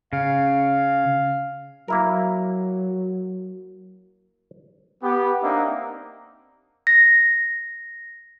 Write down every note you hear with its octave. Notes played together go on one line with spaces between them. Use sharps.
C#3 F5
F#3 A#3 E4 A#4
B3 G4
A#3 C4 D4 D#4 E5 F#5
A#6